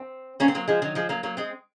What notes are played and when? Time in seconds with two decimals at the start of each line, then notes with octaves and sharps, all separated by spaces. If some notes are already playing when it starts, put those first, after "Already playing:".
Already playing: C4
0.40 A#3 C#4
0.48 C4
0.55 F#3 A#3
0.68 F3 G#3
0.82 D#3 F#3
0.95 F3 G#3
1.09 F#3 A#3
1.23 F#3 A#3
1.37 G#3 C4